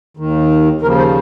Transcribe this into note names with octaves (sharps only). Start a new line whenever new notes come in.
D#2 D#3
D#2 C#3 F3 A#4
C5